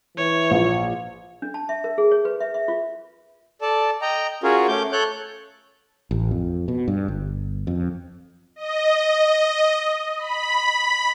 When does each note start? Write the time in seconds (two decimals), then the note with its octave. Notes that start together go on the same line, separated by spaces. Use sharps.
0.17 E3 C#5
0.51 A#1
1.42 D4
1.54 A5
1.69 E5
1.84 A#4
1.98 G#4
2.11 C#5
2.25 B4
2.40 E5
2.54 E5
2.68 F4
3.61 A4 D5 A5
4.02 D#5 G5 A#5
4.43 C#4 F4 F#4 G#4 A#4 C#5
4.68 A3 C#4 D6 G6
4.92 A4 C#5 F#6 G6
6.11 A1
6.31 F2
6.68 B2
6.88 G2
7.08 G1
7.67 F2
8.56 D#5
10.18 B5